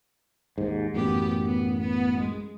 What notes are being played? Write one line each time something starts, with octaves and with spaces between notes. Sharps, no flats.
D#2 G#2
A1 F#2 B3 G4
B3
B3
G#3